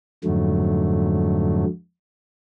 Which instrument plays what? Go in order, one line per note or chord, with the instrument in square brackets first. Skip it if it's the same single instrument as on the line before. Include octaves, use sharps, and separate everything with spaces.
[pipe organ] F2 G#2 D3 F#3 A3